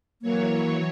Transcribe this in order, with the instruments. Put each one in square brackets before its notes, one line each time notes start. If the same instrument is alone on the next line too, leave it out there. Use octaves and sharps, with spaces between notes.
[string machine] E3 F#3 C#5 [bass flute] A#3